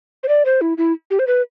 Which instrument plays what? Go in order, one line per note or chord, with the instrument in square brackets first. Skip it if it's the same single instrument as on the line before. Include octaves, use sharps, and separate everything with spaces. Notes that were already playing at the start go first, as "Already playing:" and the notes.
[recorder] C5
D5
C5
E4
E4
G4
C5
B4